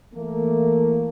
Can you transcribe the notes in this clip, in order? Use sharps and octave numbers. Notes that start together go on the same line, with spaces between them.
E3 A3 A#3